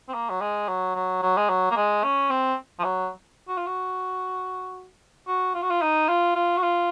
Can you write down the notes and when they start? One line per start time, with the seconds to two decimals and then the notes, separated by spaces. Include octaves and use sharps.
0.09 C4
0.14 A#3
0.30 F#3
0.41 G#3
0.68 F#3
0.95 F#3
1.23 F#3
1.37 G#3
1.49 F#3
1.70 A#3
1.76 G#3
2.04 C#4
2.30 C4
2.79 F3
2.84 F#3
3.48 F#4
3.57 F4
3.66 F#4
5.28 F#4
5.55 F4
5.62 F#4
5.70 F4
5.82 D#4
6.09 F4
6.36 F4
6.57 F#4
6.62 F4